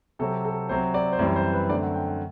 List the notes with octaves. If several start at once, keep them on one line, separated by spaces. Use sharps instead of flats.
C3 F#3 C4 A4
A4
C3 F#3 C4 C5
D5
C5
F#2 E3 G3 C4 D5
C5
B4
F#2 D3 A3 C4 D5
F#5
G5
F#5